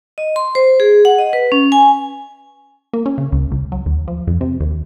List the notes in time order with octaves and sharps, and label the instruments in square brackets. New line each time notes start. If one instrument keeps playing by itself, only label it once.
[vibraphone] D#5
C6
C5
G#4
F#5
D#5
B4
C#4
G#5
[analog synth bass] A#3
C#4
C#3
C#2
C#2
F#3
D#2
F3
F2
C3
D#2